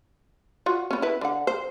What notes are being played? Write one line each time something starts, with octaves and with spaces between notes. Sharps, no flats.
F4 F#4
B3 C#4
E4 B4
D3 F#5
C5